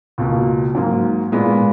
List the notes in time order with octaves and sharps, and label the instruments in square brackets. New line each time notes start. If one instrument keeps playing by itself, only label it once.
[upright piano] C#2 B2 A#3
G#2 F#3 A#3
A#2 G#3 B3